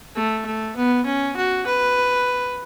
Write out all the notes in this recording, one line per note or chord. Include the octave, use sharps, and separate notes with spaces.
A3
A3
B3
C#4
F#4
B4